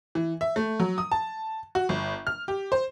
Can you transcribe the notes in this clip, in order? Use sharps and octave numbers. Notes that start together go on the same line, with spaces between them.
E3
E5
A3
F#3
D#6
A5
F#4
G1
F6
G4
C5